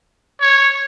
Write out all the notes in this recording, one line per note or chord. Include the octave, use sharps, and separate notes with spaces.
C#5